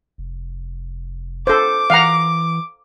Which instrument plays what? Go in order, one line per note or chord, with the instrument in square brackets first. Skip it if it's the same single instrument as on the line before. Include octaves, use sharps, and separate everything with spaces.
[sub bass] F1
[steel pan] A4 C5 [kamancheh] D6
[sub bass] E3 [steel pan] F5 F#5 A#5